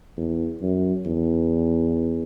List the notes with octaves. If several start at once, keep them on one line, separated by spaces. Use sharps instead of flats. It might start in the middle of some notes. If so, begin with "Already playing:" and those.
E2
F#2
E2